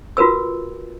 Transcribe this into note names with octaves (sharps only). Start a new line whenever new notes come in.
F4 F#4 A#4 B4 E6